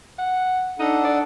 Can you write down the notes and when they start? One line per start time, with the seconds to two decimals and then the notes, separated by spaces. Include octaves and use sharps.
0.19 F#5
0.79 D4 D#4 A4 F#5
1.05 D5